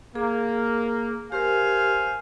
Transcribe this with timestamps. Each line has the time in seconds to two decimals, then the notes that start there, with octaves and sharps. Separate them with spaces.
0.15 A#3 G#4
1.32 G4 A#4 C5 F5 G#5